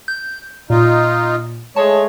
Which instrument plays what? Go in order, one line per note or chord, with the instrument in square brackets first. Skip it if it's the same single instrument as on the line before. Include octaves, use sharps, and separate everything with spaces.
[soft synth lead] G6
[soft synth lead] A#2 [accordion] D#4 F4
[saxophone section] G#3 C#5 [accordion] A3 [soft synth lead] A5